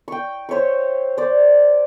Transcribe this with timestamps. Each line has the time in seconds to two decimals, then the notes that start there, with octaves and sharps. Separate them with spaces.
0.08 G5 C#6
0.49 C5 C#5 E5 C#6
1.17 C5 D5